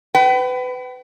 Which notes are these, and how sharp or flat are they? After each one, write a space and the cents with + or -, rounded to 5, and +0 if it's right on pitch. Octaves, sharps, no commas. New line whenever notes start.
B4 +25 G5 -40